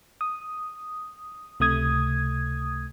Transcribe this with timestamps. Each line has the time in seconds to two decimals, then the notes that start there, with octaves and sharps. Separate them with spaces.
0.21 D#6
1.60 C#2 C3 A3 D#6 G#6